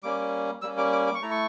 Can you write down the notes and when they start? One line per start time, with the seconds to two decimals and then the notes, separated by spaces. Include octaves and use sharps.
0.03 G3 A#3 C#4 D6
0.62 G3 A#3 C#4 E6
0.78 D6
0.92 D6
1.07 D6
1.15 C#6
1.21 A3 E4 A#5
1.31 C#6